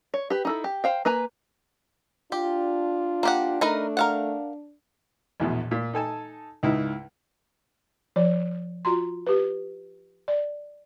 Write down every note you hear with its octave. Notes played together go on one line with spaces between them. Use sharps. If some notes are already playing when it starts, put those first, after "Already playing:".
C#5
G4 B4
D#4 E4 A4
G4
C5 F5 G5
A#3 B4 G#5 A#5
D4 F4 G4
A#3 G4 F#5
A3 D#4 A#4 B4
A#4 F5 F#5
A#1 E2 B2
A#2
D#4 A4 G#5 A5
C#2 G#2 D#4 E4
F3 D5
F4 F#4 A#5 C6
G4 B4
D5